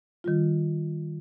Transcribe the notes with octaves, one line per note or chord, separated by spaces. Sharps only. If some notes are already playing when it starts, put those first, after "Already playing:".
D#3 G3 F4